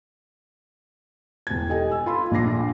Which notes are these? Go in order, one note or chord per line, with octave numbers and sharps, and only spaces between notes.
E1 G#6
G4 A4 D#5 G#5
E6
F4 B5 C6 E6
A#1 A#2 D4 D6 A#6 C7